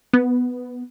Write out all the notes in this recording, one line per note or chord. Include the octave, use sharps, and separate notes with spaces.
B3